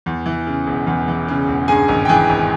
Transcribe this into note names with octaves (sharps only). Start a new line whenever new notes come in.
E2
E3
C#3
E1
E2
E3
C#3
E1
G2 G#4 G#5
G#1
G5
E3 G#4 G#5
G#1